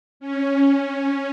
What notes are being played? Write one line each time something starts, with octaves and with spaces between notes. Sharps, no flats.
C#4